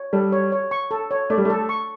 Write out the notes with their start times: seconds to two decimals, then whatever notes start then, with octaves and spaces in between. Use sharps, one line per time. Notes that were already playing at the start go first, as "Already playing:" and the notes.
Already playing: C#5
0.13 G3 A4
0.32 C#5
0.52 C#5
0.71 C#6
0.91 A4
1.11 C#5
1.30 A3 D5
1.38 G3
1.45 A3 A4
1.69 C#6